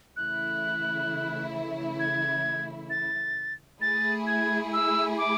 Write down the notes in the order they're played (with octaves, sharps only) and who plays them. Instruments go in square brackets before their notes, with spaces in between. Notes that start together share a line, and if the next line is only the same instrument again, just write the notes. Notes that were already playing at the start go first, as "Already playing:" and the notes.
[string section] C#3 E3 A3 E4 [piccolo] F#6
[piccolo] G#6
A6
[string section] A3 E4 G#4 [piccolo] A6
[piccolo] G#6
E6
D6